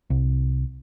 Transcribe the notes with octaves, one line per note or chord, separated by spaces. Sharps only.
C2